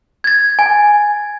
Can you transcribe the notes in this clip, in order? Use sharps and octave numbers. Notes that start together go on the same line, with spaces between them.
G#6 A6
G#5